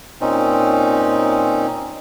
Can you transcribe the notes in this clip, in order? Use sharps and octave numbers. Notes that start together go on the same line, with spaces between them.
A#2 C4 C#4 D#4